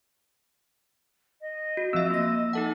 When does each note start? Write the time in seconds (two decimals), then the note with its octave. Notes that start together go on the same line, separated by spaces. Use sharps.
1.41 D#5
1.77 F#4
1.93 F3 C4 E5 E6
2.10 A#3 A#6
2.53 D#4 A4 F#5 A5